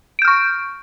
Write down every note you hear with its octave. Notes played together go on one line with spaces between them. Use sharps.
C#6 F6 G6 D7